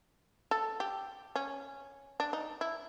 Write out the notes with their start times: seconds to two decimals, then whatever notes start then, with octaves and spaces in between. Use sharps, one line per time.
0.51 A4
0.80 G4
1.36 C#4
2.20 D4
2.33 D#4
2.61 E4